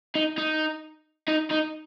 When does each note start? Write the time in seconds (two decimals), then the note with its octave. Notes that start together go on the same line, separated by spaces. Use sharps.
0.15 D#4
0.38 D#4
1.28 D#4
1.50 D#4